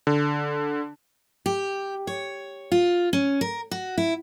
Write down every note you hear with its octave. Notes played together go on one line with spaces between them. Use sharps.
D3
G4
C#5
F4
C#4
A#4
F#4
E4